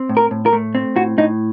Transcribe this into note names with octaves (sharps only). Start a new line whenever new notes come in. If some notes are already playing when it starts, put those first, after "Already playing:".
Already playing: C4
A2
A#4
A2
A#4
A3
C4
A2 F#4
A2 D#4